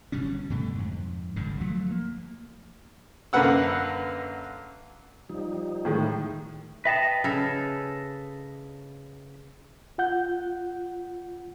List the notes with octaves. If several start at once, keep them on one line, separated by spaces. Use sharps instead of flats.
G1 B2 G3 C#4
G2 B2 D3 A3
F2 G#2
G1 C#2 G2 D3
F3 F#3 A3
A#3
F#2 D3 A#3 B4 F#5 E6
F3 G3 D#4
A2 D#3 G#3
B4 D#5 E5 G5 A5
C#3 A4
F4 F#5 G6